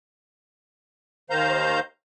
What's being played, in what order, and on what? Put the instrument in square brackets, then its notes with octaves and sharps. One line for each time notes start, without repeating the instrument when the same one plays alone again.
[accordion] D#2 D#3 C5 F5 A#5 G6